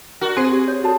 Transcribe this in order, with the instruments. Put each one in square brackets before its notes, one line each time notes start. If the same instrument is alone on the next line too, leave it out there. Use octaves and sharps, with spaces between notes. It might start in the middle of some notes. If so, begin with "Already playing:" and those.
[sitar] F#4 [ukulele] A#4 D5
[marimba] C4 C5 [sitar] G#4
[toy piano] G4
C#5
[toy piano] F#4 A4 [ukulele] D5 F5 A5